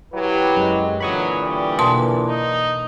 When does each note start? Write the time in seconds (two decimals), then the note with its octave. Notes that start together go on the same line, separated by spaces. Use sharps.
0.14 F#3 E4 G4 B4
0.57 F#2 G#3
1.01 A#2 D3 E3 F#3 B5 C#6 D#6
1.42 G3
1.79 B2 A#3 A5 C6
2.28 D#4